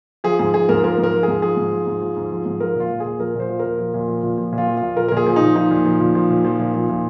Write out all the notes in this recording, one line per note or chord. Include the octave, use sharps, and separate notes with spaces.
F3 G#4
G#2 G#4
F3 G#4
G#2 A#4
F3 A#4
G#2
A#4
F3
G#2 G#4
F3 G#4
G#2
F3
G#2
F3
G#2
F3
G#2
F3 A#4
A#2 F4
F3
A#2 G#4
F3 A#4
A#2 C5
F3
A#2 A#4
F3
A#2
F3
A#2
F3
A#2
F4
F3
F4
A#2
F3 A#4
A#4
A#2
G#4
F3
A#2 D#4
F3 D#4
A#2
F3
A#2
F3
A#2
F3
A#2
F3
A#2